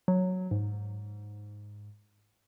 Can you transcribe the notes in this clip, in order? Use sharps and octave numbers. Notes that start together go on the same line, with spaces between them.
F#3
G#2